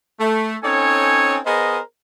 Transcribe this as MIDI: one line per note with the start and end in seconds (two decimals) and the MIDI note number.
0.20 0.56 57
0.64 1.38 60
0.64 1.38 61
0.64 1.38 63
0.64 1.38 69
0.64 1.38 73
0.64 1.38 80
1.46 1.79 59
1.46 1.79 68
1.46 1.79 70
1.46 1.79 72
1.46 1.79 75